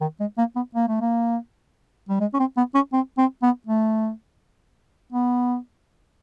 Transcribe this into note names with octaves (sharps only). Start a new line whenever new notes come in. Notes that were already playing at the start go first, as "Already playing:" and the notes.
D#3
G#3
A#3
B3
A#3
A3
A#3
G3
G#3
C#4
C4
B3
C#4
C4
C4
B3
A3
B3